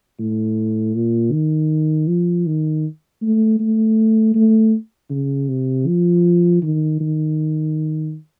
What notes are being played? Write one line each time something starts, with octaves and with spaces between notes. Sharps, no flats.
A2
A#2
D#3
F3
D#3
A3
A3
A3
C#3
C3
F3
D#3
D#3